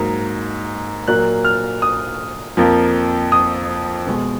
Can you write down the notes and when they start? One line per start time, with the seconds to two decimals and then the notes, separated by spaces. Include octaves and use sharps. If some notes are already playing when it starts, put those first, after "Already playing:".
Already playing: G#2 F#3 A#3
1.08 A#2 F#3 A#3 F#6
1.45 F6
1.82 D#6
2.57 F2 F3 A#3
3.32 D#6
4.07 B2 G#3